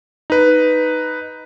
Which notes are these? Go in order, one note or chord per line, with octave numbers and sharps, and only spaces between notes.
D#4 B4